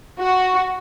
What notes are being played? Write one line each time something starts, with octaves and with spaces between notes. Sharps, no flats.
F#4